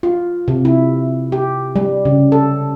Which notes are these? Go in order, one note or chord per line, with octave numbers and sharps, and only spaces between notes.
F4
C3
E4
G4
G3
C#3
A4